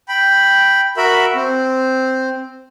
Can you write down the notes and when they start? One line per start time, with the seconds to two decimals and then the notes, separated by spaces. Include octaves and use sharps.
0.08 G5 B5
0.97 F#4 A#4 E5 B5
1.35 C4